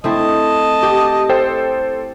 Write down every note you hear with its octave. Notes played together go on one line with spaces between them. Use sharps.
A3 C4 E4 D#5 A5
G4
A4 C5 G5